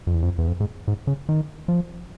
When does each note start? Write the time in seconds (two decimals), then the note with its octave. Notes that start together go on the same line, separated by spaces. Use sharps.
0.07 F2
0.14 E2
0.22 F2
0.38 E2
0.48 F2
0.60 G#2
0.88 G#2
1.07 C#3
1.29 D#3
1.68 F3